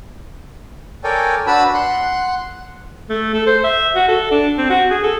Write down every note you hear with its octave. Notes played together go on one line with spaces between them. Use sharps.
A4 A#4 C#5 D5 G5 G#5
D4 F#4 B4 A5 B5 E6
F#5 C6 F#6
A3
A4
C5
E5
F#4
A4
D4
C4
F#4
G#4
A4